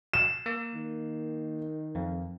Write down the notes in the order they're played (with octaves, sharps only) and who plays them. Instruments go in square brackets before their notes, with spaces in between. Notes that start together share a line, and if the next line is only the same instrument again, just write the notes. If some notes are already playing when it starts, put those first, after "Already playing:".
[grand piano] E7
[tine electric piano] A#3
[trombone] D#3
[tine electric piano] F2